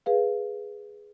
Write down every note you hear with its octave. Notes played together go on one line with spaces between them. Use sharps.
G#4 B4 F5